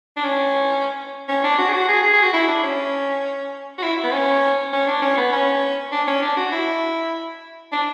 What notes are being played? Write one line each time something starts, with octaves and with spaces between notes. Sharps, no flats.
D4
C#4
C#4
D4
F#4
G#4
F#4
G#4
G#4
G#4
F#4
E4
D4
C#4
F#4
E4
B3
C#4
C#4
D4
C#4
B3
C#4
D4
C#4
D4
F#4
E4
D4